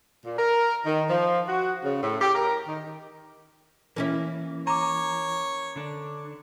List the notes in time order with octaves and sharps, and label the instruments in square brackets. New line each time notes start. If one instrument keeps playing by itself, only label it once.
[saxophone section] A#2
A#4
D#3
F3
F#4
C#3
A2
G4
A#4
D#3
[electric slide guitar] E3 [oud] A#3 C#4 E4
[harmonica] C#5 [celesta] A#5 D6
[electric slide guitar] D3 D4